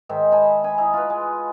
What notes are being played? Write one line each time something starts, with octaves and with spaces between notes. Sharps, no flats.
G#2 D#3 C5 E5
G#5 A5 B5
G#5 B5
E4 D#5 A#5
F4 B4
G#3